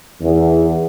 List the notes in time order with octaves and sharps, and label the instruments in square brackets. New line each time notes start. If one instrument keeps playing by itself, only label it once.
[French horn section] E2